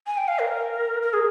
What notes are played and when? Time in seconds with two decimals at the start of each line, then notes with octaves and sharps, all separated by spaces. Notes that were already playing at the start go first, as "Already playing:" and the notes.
0.07 G#5
0.17 G5
0.28 F5
0.39 A#4
1.02 A#4
1.13 G#4